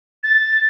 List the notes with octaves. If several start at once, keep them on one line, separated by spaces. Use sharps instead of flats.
A6